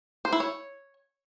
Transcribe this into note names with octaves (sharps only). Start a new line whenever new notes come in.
C5
E4
C#5